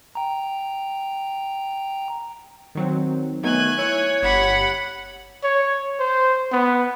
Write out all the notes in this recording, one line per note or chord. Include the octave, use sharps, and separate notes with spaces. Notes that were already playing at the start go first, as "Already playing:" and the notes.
G5 A#5
D#3 F#3 C4
D#3 F#3 A3 B3 G#5 F#6
E4 C#5 C#7
G1 G4 F#5 B5
C#5
C5
B3